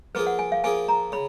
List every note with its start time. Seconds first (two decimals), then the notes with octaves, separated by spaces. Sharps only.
0.15 F3 A#3 F4 G#4 B4
0.27 F#5
0.39 G#5
0.52 F5
0.64 F3 A#3 F4 G#4 G#5
0.88 A#5
1.12 C#3 B5